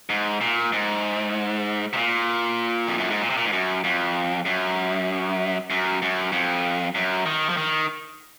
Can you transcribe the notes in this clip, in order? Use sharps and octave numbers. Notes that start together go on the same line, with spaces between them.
G#2
A#2
G#2
C3
A#2
F2
F#2
G#2
A#2
C3
A#2
G#2
F#2
F2
F#2
F#2
F#2
F2
F#2
D#3
F3
D#3